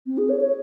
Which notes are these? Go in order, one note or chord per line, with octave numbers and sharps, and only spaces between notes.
C4
G#4
C#5
C#5